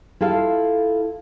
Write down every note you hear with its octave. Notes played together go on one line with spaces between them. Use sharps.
E4 F4 A4 F5